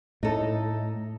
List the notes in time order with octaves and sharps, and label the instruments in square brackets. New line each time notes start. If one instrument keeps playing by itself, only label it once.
[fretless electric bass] A2 [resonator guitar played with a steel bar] D#4 A4